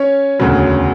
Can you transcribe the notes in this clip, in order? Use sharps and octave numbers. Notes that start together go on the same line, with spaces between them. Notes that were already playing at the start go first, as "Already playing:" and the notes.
Already playing: C#4 C#5
E1 D2 C#3 F#3